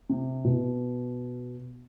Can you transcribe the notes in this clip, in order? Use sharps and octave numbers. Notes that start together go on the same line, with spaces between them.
C3
B2